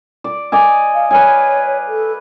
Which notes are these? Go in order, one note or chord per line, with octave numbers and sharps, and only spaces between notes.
D5
D5 D#5 G#5
F5
B4 C#5 F5 G#5
A4